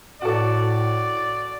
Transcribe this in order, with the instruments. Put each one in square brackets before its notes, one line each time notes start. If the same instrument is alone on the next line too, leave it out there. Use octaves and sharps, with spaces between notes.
[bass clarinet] A2 [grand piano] F#4 A4 [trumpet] D5